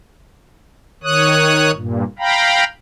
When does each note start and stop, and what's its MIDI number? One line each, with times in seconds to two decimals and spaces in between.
1.04 1.71 51
1.04 1.71 73
1.04 1.71 87
1.04 1.71 90
1.74 2.04 43
1.74 2.04 46
2.19 2.64 77
2.19 2.64 79
2.19 2.64 82
2.19 2.64 83